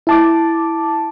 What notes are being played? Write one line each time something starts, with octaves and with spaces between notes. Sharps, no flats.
E4 A5 D6